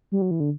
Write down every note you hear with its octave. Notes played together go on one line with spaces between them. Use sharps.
G3
F#3
E3
D3